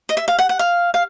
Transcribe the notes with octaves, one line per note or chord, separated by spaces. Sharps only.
D#5
E5
F5
F#5
F#5
F5
F5